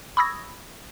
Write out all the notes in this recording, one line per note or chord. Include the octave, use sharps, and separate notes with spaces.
B5 C#6 D#6 E6 G#6 A#6